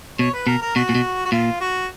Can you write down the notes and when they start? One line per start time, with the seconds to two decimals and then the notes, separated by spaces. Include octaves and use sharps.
0.19 B2 C#5
0.33 B4
0.47 B2 A#4
0.62 A#4
0.76 B2 F#4
0.89 A#2
0.95 B2
1.25 F#4
1.32 A#2 F4
1.61 F#4